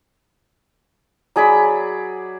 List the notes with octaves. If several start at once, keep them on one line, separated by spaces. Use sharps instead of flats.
F#3 G#4 D5 B5